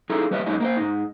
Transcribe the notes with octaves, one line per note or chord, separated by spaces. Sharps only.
D#4 E4 G#4 A4 A#5
G3 B4 C#5 D#5 E5
F#2 G#3 D#4 C#5 D#5
A#3 A#4 C5
G#2 D#4